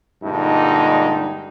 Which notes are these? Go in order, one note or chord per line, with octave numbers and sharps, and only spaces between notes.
G2 A#2 D3 G#3 D#4